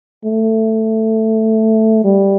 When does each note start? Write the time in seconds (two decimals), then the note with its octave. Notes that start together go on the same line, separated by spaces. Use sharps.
0.25 A3
2.04 G3